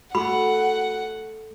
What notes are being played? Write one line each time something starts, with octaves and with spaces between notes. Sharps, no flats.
A3 F#4 F#5 B5